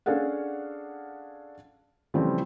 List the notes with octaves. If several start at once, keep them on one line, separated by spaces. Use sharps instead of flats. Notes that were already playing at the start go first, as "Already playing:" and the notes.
C#4 D4 G#4 A4 F5 F#5
C#3 E3 F3 G3 A3 C4